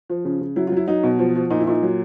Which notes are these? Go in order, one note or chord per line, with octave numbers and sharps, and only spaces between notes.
F3
C#3
C#3
F#3 E4
F4
F#3 E4
F#3 D#4
B2
F3
F3
A#2 D#4
E4
A#2 D#4
F#3